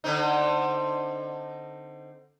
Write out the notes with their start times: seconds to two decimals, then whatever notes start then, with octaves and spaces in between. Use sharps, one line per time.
0.04 D3 C4 D#4